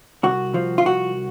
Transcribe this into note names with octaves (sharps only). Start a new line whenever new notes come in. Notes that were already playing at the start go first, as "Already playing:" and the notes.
C2 F#4
F3
F4
C2 F#4